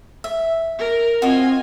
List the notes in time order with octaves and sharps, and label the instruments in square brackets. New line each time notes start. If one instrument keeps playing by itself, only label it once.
[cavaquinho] E5
[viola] A#4
[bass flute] C4 [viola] F4 G#5 [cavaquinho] F#4 D#5